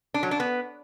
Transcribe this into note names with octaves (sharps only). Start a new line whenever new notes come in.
D4
F#3
D4
B3